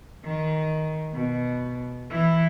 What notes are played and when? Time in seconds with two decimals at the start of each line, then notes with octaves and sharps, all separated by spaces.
0.24 D#3
1.14 B2
2.10 E3 E4